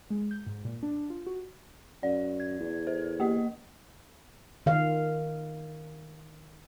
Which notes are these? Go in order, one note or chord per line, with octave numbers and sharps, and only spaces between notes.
G#3
G6
G#2
A#2
D4
F4
F#4
F#2 D5
G#6
E2
A4 C5
A#3 G4 D#5
D#3 F5